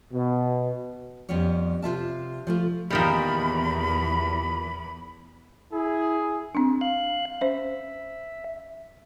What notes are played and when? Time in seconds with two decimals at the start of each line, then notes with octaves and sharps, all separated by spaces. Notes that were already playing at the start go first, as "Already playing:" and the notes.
0.13 B2
1.29 F2 G3 B3 C#4 C#5
1.82 C3 F4 E5 A5
2.47 F3 A3 F4
2.90 E2 A#2 D#3 G3 B5
5.73 E4 G#4
6.55 C4 D4
6.81 F5 F#6
7.41 C#4 C5 E5